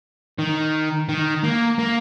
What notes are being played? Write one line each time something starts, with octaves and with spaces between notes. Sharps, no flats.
D#3
D#3
A#3
A#3